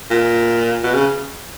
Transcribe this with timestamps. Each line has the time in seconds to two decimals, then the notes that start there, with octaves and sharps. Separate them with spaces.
0.10 A#2
0.83 B2
0.94 C#3